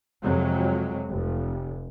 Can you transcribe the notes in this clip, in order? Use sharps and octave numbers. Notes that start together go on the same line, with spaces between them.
F2 C3 F#3 G#3
F1